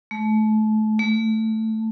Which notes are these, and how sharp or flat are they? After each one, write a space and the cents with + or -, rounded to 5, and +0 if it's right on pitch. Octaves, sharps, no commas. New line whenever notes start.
A3 -30
A3 +5